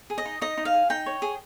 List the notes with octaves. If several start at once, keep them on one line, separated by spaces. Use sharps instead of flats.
G#4
D#5
D#4
D#4 D#5
D#4
F5
G#4
D#4 G5
C#5
G#4